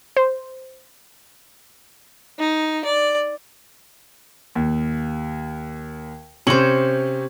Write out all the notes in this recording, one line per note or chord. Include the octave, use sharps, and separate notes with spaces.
C5
D#4
D5
D#2
C3 C#4 C5 C#5 F#7